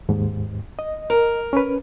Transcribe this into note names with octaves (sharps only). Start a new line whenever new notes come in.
D#2 G#2
D#5
A#4
C#4 B4